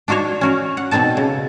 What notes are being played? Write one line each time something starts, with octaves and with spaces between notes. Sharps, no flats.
D4 D#4 F#4 C5 C#5
C#4 F#4 A#4
F#5
B2 C4 D#4 A4 A5
C#3